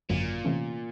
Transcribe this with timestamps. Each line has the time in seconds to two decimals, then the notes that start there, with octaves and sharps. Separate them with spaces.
0.10 G#1 F#2 A#2 D3 F#3
0.45 C3 E3 A3 C#4